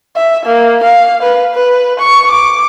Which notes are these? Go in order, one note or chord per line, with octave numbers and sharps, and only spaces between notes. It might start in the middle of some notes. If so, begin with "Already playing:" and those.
E5
A#3
F5
B4
B4
C#6
D6